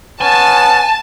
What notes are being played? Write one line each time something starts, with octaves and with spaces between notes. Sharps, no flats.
B3 C#4 G#5 A5